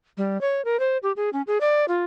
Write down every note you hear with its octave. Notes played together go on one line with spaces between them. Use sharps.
G3
C#5
A#4
C5
G4
G#4
C#4
G#4
D5
F4